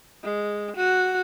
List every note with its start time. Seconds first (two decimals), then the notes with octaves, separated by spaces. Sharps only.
0.24 G#3
0.76 F#4